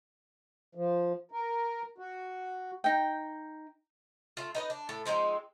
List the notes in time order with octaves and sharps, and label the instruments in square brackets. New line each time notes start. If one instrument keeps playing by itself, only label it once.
[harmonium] F3
A#4
F#4
[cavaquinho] D#4 G5
[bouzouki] A3 F4
D#4 B4 D#5
D4
A2 A4
F3 G#3 C4 D#4